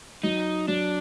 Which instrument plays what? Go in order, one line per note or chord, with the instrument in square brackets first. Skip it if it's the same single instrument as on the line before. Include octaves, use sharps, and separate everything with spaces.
[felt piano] F#3 [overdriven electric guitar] D#4
[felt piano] F#3 [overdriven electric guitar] D4